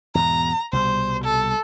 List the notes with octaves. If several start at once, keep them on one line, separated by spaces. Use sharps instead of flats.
E2 G#2 B2 A#5
C2 B2 G3 C5
A4